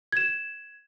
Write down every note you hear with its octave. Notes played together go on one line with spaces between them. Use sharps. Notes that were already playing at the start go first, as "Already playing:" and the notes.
G#6 E7